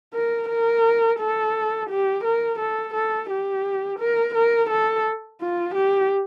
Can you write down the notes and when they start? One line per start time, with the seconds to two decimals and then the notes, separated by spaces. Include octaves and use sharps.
0.14 A#4
0.49 A#4
1.20 A4
1.90 G4
2.25 A#4
2.60 A4
2.94 A4
3.30 G4
3.99 A#4
4.35 A#4
4.70 A4
5.41 F4
5.75 G4